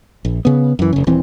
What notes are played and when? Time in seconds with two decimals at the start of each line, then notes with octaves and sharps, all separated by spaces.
0.25 A#1
0.45 C#3 B3
0.79 F#2 E3
0.93 F1 C#3
1.07 D#1 E3 C4